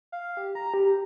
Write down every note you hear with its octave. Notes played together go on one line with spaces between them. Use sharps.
F5
G4
A#5
G4